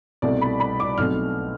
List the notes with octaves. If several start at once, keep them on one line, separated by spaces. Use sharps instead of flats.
C2 B2 A3 C4 D5
B5
B5
D6
B1 B2 A3 C4 F6